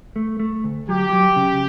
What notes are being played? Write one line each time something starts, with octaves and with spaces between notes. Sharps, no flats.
A3
A3
D2
F#3 G4
F#3
C#3